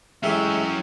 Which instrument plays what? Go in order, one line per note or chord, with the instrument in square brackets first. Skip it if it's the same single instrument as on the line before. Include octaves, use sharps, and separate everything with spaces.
[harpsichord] A1 G4 [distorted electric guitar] F#3 C#4 [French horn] G#3 [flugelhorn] E5